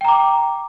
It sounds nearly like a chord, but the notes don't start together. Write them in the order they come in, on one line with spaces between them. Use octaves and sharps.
G5 A#5 D6